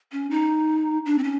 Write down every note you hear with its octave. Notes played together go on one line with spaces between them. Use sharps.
C#4
D#4
D4
C4
C#4